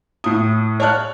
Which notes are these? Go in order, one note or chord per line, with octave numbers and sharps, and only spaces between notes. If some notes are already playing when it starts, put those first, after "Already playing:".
A2 D#6
C#5 D5 A5 F6 F#6